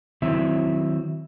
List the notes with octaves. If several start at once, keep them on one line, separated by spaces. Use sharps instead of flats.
D#3 F#3 C4 E4 E5